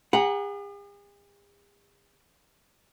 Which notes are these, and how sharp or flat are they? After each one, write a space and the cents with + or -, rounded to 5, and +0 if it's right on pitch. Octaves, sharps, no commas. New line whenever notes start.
G#4 -45 F#5 +0 A#5 +25